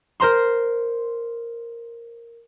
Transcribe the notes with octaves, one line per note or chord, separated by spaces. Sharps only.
A#4 C5 A#5 C6